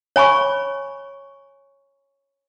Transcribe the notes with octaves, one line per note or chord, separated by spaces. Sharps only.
C#5 G#5 B5 C#6